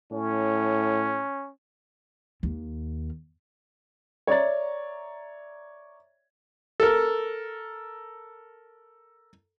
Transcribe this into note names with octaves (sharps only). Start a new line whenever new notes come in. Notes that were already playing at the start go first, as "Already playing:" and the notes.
A2 C#4
D#2
C#5 D5 E5 A#5 A6
A4 A#4